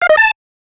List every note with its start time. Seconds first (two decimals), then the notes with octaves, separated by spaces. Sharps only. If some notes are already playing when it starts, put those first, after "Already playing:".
0.02 F5
0.09 D#5
0.17 A5